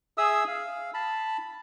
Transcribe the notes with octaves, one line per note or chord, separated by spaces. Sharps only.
G#4 E5 D#6 E6
F5
A5 B5